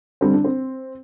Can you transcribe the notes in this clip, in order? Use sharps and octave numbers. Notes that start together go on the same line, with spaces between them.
D3 G3 C4
D4
C4